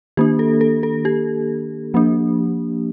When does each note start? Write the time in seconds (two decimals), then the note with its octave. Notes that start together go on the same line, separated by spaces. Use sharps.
0.17 D#3 A#3 D4 G4
0.39 A4
0.61 A4
0.83 A4
1.05 G4
1.94 F3 A#3 D4